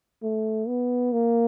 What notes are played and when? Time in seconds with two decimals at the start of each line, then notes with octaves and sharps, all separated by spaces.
0.23 A3
0.68 B3
1.12 A#3